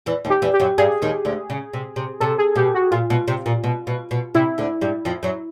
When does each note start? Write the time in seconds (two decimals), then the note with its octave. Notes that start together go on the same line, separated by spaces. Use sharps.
0.06 E2 E3
0.25 D#2 D#3
0.30 G4
0.42 E2 E3
0.54 G4
0.60 F#2 F#3
0.78 G2 G3 G#4
1.02 D#2 D#3
1.25 D2 D3
1.50 C#3
1.73 C3
1.96 C3
2.20 C3 A4
2.38 G#4
2.56 B2 G4
2.75 F#4
2.91 A#2 F4
3.10 B2
3.28 C3
3.46 A#2
3.64 B2
3.87 B2
4.11 B2
4.35 C3 E4
4.58 D2 D3
4.81 G2 G3
5.05 F2 F3
5.23 F#2 F#3